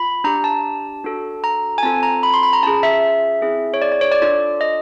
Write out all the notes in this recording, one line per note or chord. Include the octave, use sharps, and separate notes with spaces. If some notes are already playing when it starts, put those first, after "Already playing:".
Already playing: F4 B5
D4 G4 A#5
A5
D4 F#4 A4
A#5
G#5
C4 F4 A4 A5
A#5
B5
C6
B5
A#5
C#4 F4 G#4 A5
E5
C4 E4 G#4
C#5
D5
D5
C#5
D5
D4 F4 A4 D5
D#5